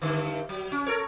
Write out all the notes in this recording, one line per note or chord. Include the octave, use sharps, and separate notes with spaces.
G2 D3 D#3
F#3
C#4
A4 A#4 C#5